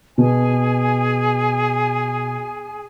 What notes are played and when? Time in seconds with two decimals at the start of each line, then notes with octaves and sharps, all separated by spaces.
0.18 B2 G#4 G#5